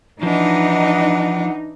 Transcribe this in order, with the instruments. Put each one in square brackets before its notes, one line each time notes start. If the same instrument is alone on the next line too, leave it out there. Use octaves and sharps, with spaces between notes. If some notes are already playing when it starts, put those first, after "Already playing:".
[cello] E3 D4 [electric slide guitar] F3 [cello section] D#4 [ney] F#5